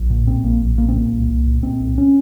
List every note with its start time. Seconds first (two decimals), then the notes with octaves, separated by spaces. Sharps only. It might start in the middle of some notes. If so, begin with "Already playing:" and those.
Already playing: A#1
0.10 A#2
0.27 A#2 C4
0.44 A#1 A#3
0.61 A#1
0.77 A#2 A#3
0.88 C4
0.95 A#2 A#3
1.13 C2
1.29 C2
1.46 A#2
1.63 A#2 C4
1.80 C2
1.98 C#4